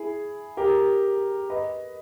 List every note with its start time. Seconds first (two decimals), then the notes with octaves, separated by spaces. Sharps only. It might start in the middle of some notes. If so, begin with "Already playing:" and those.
Already playing: E4 G#4
0.57 G4 A#4
1.50 B4 D#5